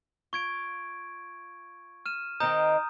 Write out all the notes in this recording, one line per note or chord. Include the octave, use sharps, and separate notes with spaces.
F4 C#6 G#6 D7
F6 D#7 E7
D#3 C4 D#4 A#5 D#6 G6